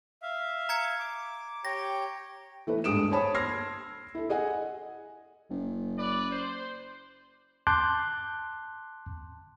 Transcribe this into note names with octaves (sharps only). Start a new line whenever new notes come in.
E5 F5
A#5 G#6 C#7
D6
G4 C#5 G5 A#6
E3 A3 A4 B4
D2 G2 G#3 D#6 D7 E7
C5 C#5 A5 B5 D#6
C6 E6 F6 G#6 A#6 C7
E4 A4
G#4 D#5 F#5 G#5
F#1
B4 D5
C5
A5 C6 D6 F#6 G6